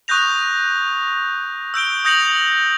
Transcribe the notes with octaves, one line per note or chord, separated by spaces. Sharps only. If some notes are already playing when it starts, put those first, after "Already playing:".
C#6 D#6 F#6 G6 A#6 F7
E6 G6 D7 G7
D#6 G6 A#6 C#7 F7 F#7